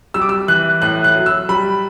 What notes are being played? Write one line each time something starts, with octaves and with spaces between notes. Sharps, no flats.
G3 E6
D6
E6
E3 F#6
A2 F#6
F#6
F#3
E6
G3 B5